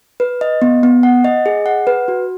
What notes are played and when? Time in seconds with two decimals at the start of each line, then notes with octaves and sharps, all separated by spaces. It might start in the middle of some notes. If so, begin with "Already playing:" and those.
0.20 B4
0.41 D#5
0.62 B3
0.83 B3
1.03 F#5
1.24 D#5
1.46 G#4
1.66 F#5
1.87 B4
2.08 F#4